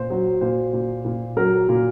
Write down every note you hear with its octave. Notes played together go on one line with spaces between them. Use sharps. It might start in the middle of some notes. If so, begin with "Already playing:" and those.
Already playing: A#2 C5
F#3
A#2 C5
A#2
A#2
F#3 A#4
A#2